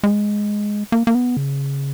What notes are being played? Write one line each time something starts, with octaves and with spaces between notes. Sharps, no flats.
G#3
A#3
A#3
B3
C#3